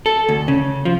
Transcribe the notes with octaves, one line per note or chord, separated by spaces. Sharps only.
A4
D2
C#3
F3